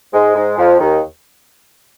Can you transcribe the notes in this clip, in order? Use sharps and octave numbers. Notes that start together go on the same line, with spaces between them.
G#2 G#3
G#2 G#3
F2 F3
D#2 D#3